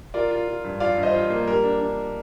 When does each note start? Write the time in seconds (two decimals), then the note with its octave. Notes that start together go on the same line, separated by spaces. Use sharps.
0.14 F4 A#4 D5
0.31 F4
0.48 F4
0.64 G2
0.80 F4 D5 F5
0.97 G2
1.03 C5 D#5
1.14 F4
1.30 A#3
1.47 G3 A#4
1.64 D4
1.80 D4